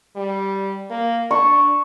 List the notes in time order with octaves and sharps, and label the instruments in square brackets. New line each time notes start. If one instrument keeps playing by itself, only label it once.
[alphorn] G3
A#3
[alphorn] D4 [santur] C#6